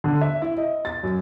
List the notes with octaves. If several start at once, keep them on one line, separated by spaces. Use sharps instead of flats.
D3
E5
E4
D#5
A6
F#2